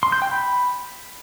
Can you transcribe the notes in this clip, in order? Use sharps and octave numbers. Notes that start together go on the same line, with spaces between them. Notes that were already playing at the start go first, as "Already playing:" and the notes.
C6
G6
G5
B5